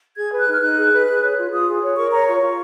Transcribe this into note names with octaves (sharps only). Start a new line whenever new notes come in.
G#4 G#6
B4
F#6
D#4 F6
D#4 F#6
G#4
B4
G#4
C#5
F4
F4 D#6
G#4
C#5
A#4 C#6
C#5 A#5
F4 C#6
F4